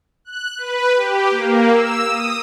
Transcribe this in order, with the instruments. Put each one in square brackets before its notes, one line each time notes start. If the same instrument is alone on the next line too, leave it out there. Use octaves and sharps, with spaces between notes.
[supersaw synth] F#6
B4
G4
A#3
E6
D#6